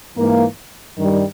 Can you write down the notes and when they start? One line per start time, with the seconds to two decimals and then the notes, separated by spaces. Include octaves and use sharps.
0.17 G#2 E3 A#3
0.96 G2 D#3 G3